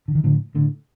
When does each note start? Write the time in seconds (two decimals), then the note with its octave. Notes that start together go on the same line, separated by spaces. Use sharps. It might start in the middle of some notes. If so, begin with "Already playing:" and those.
0.08 D3
0.15 D#3
0.23 A2 D3 F3
0.55 A2 D3